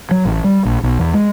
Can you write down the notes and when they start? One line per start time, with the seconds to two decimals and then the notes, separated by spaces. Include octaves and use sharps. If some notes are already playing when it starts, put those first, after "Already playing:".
0.11 F#3
0.25 A1
0.44 G3
0.65 A#1
0.83 B1
0.99 E2
1.14 G#3